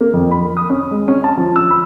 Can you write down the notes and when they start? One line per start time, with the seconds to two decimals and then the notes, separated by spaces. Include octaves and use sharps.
0.01 A#3
0.13 F2
0.31 B5
0.57 D#6
0.70 C#4
0.91 G#3
1.08 C#4
1.24 A5
1.37 F3
1.56 E6
1.70 B5